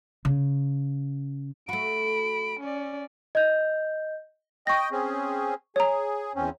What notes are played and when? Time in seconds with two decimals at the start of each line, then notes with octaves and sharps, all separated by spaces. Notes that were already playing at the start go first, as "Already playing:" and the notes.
0.25 C#3
1.69 A3 F#4 B5 D7
2.60 C#4 D5
3.35 D#5 G6
4.67 D#5 G5 C#6 A#6
4.92 C4 C#4 G#4
5.76 G#4 C#5 A#5
6.36 E2 C4 C#4